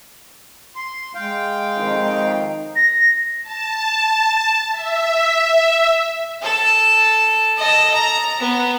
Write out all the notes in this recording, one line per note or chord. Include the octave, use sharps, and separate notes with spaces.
C6
G#3 F5 G5
F2 D#3 D#4
A#6
A5
E5
A4
A4 D#5
A#5
B3